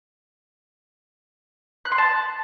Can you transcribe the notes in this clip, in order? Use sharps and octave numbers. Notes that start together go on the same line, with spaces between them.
F#6
C6
A5